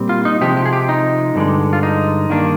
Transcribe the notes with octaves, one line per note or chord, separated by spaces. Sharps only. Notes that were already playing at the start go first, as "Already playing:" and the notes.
Already playing: A#2 G3 C4
F4
D#4
C3 F3 G#3 G4
G4
G#4
G4
D#4
G2 D3 G#3
F4
D#4
G2 D#3 A#3 D4